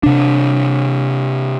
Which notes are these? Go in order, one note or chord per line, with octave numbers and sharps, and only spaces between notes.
C3 D4